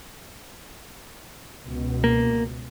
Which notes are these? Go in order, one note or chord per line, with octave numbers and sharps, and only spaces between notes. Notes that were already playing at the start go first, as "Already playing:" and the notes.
C#2 B2
A#3